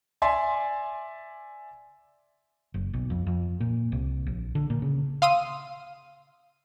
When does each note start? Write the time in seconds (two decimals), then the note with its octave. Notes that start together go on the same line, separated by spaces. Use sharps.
0.22 D5 E5 G#5 C6
2.74 F#1
2.94 B1
3.10 F2
3.27 F2
3.60 A#2
3.92 C2
4.27 A#1
4.55 D3
4.70 A#2
4.82 C#3
5.22 F5 C6 D#6 E6 D#7